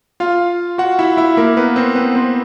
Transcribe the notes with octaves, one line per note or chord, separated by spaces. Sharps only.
F4 F5
F#4 F#5
E4 E5
E4 E5
A#3 A#4
B3 B4
C4 C5
B3 B4
C4 C5